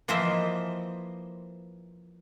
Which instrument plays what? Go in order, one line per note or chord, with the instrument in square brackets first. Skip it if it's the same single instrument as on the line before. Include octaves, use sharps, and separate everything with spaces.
[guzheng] E3 F3 A#3 C5 D#5 E5